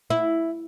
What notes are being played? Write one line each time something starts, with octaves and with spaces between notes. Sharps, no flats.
E4